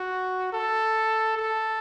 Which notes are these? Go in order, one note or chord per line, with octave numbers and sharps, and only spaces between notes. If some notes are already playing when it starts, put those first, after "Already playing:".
Already playing: F#4
A4
A4